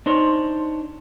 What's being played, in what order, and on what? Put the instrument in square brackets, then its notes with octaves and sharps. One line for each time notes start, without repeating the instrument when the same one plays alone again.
[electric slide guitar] D4 D#4 C5 C#5